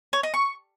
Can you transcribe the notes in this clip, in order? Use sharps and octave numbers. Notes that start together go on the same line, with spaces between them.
C#5
D#5
C#6